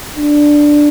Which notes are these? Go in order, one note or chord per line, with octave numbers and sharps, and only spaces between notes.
D4